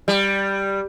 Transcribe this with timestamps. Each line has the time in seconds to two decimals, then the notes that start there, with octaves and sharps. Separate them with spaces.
0.08 G3